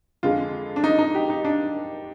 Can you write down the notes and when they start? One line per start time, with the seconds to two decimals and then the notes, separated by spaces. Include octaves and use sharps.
0.23 F2 D3 G#3 F4
0.76 D4
0.84 D#4
0.98 D#4
1.15 G4
1.30 D#4
1.45 D4